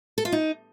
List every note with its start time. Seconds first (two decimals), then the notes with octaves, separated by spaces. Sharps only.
0.18 A4
0.25 F4
0.32 D#4